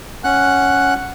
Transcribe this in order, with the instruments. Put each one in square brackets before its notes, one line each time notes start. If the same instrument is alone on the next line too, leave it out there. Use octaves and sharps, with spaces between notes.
[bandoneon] C#4 F#5 F#6